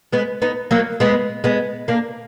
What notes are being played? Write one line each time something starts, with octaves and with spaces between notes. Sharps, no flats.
G#3 B3
B3 D#4
F#3 A#3
G#3 B3
G#3 B3
A#3 D4